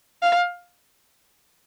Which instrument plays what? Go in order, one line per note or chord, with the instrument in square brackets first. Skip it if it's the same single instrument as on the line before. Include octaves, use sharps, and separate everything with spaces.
[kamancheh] F5